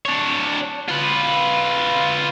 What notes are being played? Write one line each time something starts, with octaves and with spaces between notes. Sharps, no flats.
D4 C#5
F4 B4